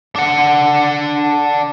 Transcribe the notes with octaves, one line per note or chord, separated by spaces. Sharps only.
D4 F#5